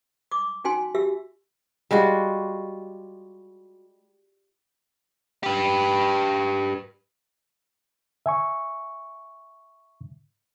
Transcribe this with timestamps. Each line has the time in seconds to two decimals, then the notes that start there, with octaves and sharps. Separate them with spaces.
0.31 D6 D#6
0.64 C#4 D#4 F#4 G5 G#5 C6
0.94 F#4 G4 E5 E6
1.91 G3 G#3 F4 F#4
5.44 G4 B4
8.26 E5 G#5 C#6